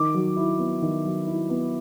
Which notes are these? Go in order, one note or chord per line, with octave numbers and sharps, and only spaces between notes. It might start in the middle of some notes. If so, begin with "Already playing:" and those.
Already playing: D#3 D6
F#3
E4
B3
D#3
F#3
E4
B3